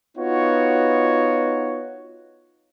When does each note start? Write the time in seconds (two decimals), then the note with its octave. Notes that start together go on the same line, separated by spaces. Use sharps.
0.17 B3 D#4 F4 F#4 C#5